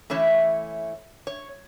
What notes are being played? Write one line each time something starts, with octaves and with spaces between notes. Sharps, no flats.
E3 A3 C#4 E4 C#5
C#5